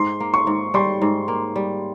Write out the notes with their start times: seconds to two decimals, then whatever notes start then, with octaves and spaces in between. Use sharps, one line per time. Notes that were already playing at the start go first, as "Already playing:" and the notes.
Already playing: G#2 C6
0.20 A#3
0.34 C#6
0.47 G#2
0.74 G3 C6
1.02 G#2
1.28 A#3
1.56 G3